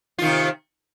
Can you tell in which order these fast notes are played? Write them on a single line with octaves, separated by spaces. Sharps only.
F4 D#3 C3